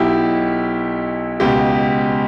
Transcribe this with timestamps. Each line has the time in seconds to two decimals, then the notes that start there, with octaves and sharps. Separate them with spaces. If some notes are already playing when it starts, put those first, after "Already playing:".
Already playing: B1 B2 E4 G4
1.40 C#2 B2 G4